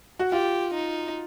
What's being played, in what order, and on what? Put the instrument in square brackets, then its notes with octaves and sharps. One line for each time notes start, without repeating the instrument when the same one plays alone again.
[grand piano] F#4
[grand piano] F4 [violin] G4
[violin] D#4